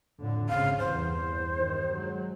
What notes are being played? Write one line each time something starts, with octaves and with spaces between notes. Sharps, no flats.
F2 A2 D3
G#1 C#3 C4 F5
E2 G2 C5
G2 D#3
F#3 G#3